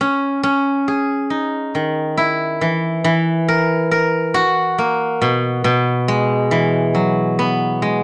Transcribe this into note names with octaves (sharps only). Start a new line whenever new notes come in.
C#4
C#4
G#4
D#4
D#3
E4
E3
E3
A#4
A#4
F#4
A#3
B2
B2
G#3
E3
F#3
B3
G#3